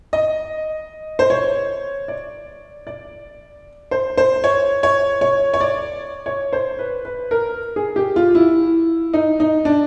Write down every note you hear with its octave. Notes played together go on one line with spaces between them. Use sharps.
D#5
C5
C#5
D5
D5
C5
C5
C#5
C#5
C#5
C#5
D5
C#5
C5
B4
B4
A#4
G#4
G4
F4
E4
D#4
D#4
D4